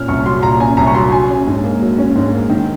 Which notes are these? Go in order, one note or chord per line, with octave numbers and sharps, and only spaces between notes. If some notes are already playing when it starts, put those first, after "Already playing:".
Already playing: A#2 C#4 F6
C2 C#6
F#3 C6
A#2 A#5
C#4 G#5
C2 A#5
C#6
F#3 C6
F#3 G#5
C#4
G#2
A#3
F#3
C#4
G#2
A#3
D#3